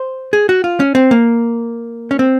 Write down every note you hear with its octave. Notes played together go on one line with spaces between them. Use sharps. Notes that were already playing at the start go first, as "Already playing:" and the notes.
Already playing: C5
G#4
F#4
F4
C#4
C4
A#3
C#4
C4